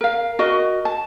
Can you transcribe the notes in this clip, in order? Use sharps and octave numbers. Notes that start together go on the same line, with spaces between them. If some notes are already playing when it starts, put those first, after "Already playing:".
A#4 F5
F#4 A#4 D#5
A5